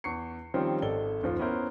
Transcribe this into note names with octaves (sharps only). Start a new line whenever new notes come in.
E2 C#6 C7 C#7
D#3 F3 G3 C4 C#4 F4
G#1 A4 D5 D#5 G7
F#1 D#2 F3
B3 C#4 E4 A#4 C5